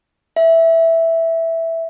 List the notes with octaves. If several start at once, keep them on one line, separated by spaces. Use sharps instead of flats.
E5